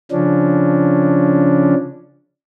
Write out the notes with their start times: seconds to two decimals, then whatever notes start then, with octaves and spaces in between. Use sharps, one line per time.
0.11 C#3 F3 C#4 D4